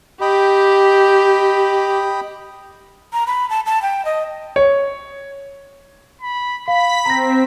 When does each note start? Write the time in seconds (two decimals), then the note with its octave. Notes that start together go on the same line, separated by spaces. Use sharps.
0.21 G4 D#5 G5 B5
3.13 A#5
3.27 B5
3.50 A5
3.66 A5
3.82 G5
4.05 D#5
4.56 C#5
6.21 B5
6.68 F5 B5 B6
7.05 C4 A#5 A#6